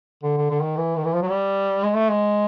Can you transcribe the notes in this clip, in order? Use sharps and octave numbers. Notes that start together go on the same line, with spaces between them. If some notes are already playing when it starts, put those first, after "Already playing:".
D3
D3
D3
D#3
E3
D#3
E3
F3
F#3
G3
G#3
A3
G#3